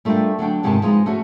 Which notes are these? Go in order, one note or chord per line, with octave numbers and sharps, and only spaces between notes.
G3 A3 D4 F4 A#4 G5
D3 F#3 D4 G5
F2 G#2 C3 D#3 G#5 A5
F3 G#3 D#4 F4 B4
A3 C#4 F#4